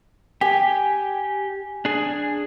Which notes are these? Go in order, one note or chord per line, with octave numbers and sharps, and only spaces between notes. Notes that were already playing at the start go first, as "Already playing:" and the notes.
G4 G#5
D4 G#4